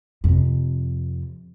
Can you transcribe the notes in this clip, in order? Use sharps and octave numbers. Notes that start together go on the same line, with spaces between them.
F2 C3